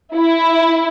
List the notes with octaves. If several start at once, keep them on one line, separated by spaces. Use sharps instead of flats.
E4